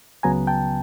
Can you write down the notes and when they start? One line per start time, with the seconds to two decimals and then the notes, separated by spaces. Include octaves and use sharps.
0.23 C#2 C#3 F#3 B3 G#5 A#5
0.47 G5 A5